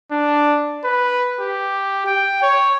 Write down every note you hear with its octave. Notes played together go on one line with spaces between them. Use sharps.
D4
B4
G4
G5
C#5